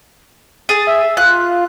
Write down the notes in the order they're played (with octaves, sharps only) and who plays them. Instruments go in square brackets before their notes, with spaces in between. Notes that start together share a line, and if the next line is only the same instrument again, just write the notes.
[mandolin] G#4 [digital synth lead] A6
[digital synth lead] E5
[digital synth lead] F4 [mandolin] F#6